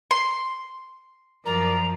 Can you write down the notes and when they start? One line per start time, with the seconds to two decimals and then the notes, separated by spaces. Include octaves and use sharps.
0.11 C6
1.46 F#2 F3 A#4 D5 A#5